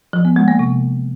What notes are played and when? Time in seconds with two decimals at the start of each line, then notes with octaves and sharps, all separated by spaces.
0.13 F3
0.25 B3
0.36 G#3
0.48 A#3
0.59 C3